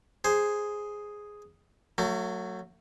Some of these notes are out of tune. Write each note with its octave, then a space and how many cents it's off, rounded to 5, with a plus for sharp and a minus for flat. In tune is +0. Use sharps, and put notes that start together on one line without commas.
G#4 +0 C5 +0
F#3 +0 A3 +35